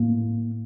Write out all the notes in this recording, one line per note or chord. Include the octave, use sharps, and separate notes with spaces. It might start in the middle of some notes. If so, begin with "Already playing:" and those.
Already playing: A2 A#3